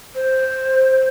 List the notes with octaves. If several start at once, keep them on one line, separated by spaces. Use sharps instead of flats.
C5